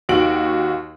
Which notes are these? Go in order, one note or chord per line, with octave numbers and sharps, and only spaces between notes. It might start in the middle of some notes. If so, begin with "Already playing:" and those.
D#2 F#4 D7 F#7